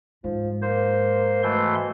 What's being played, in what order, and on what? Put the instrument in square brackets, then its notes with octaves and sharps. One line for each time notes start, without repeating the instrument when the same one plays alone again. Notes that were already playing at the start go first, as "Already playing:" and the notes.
[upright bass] G#2 [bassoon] F3
[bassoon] A#3 [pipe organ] C5
[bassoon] B2 [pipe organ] E3 A3 C6